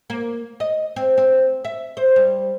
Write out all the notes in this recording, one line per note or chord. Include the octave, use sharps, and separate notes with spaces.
A#3
D#5
C4
C4
E5
C5
G3